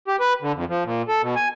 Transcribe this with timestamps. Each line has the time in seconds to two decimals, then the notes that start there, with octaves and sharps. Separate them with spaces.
0.08 G4
0.20 B4
0.42 D3
0.55 F2
0.69 F3
0.85 A#2
1.08 A4
1.22 B2
1.36 G#5